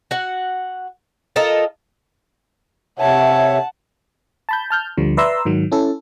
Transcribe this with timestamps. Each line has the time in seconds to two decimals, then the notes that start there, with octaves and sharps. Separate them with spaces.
0.11 F#4 F#5
1.36 F4 A4 A#4 D#5
3.00 C3 C#5 E5 F#5 A5
4.49 A5 B5 G6
4.70 A5 F6 G6
4.97 D2 D3 F3 G3
5.17 B4 D5 E5 A#5 C6 E6
5.45 G#2 D#3 F#3
5.72 C#4 E4 A4